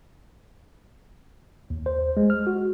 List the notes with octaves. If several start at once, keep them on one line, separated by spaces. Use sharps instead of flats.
D#2
C5
G#3
F6
F#4